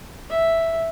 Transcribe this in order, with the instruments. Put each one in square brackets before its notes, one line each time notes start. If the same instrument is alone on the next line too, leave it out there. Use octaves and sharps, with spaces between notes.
[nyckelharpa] E5